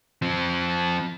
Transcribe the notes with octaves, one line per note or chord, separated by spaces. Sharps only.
F3 C4